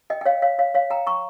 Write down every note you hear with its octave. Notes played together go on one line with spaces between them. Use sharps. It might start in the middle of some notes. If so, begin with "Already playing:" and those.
D#5 G5
G5
C#5 F5
C#5 F5
C#5 F5
C#5 F5
G5 A#5
A#5 C#6